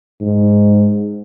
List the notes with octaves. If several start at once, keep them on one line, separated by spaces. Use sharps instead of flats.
G#2